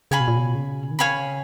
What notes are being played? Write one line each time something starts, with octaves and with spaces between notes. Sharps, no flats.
C#3 C#5 F5 G#5 B5
B2
A#2
B2
C#3
D#3
C#3 C#5 F5 G#5 B5